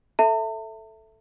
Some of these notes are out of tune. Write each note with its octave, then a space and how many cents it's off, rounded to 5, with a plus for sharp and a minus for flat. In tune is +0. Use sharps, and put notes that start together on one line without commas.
A4 +0 E5 +0 A5 +45